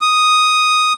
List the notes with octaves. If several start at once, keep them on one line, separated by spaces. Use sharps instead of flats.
D#6